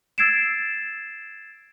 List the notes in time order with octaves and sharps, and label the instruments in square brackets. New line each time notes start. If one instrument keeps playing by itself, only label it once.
[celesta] E6 G#6 A6 C7 D7 E7